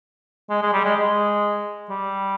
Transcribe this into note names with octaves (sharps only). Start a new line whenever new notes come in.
G#3
G#3
G3
G#3
G#3
G3